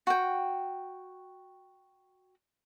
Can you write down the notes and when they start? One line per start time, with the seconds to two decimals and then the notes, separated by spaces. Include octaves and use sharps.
0.07 F#4 G5